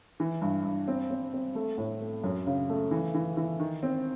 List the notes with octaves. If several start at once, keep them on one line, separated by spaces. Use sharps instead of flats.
E3
G2
G2
C4
C4
C4
A3
A2
A3
F#2
C#3
A3
E3
E3
E3
D#3
C4